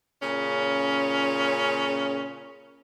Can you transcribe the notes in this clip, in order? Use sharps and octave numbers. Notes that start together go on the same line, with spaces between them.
A#2 C#3 C#4